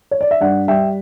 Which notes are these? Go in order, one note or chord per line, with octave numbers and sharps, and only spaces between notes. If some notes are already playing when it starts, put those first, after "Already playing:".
C#5
D5
E5
G2 D5 F#5
G3 E5 G5